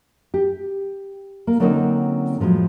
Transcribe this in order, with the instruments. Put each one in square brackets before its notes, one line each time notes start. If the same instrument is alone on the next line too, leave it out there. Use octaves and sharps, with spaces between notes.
[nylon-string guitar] G4
A#3
D3 F#3 A#3 C4 C#4 D#4
A2 F3 F#3 G#3